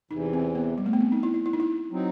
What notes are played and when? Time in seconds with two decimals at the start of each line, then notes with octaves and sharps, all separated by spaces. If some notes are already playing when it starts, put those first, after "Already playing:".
0.11 E2 C3 E3 D#4
0.33 C4
0.55 B3
0.78 G3
0.86 A3
0.93 B3
1.00 C4
1.12 D#4
1.23 E4
1.34 E4
1.46 E4
1.53 D#4
1.60 E4
1.91 F#3 C4 D#4